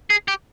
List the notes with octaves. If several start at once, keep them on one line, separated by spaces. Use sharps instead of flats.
G#4
G4